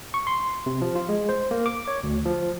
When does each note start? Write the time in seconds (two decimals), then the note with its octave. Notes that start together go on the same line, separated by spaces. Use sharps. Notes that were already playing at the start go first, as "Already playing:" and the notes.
0.14 C#6
0.27 C6
0.66 C3
0.82 F3
0.95 F4
1.09 G#3
1.29 C5
1.51 A#3
1.66 D6
1.88 C#5
2.03 D2
2.26 F3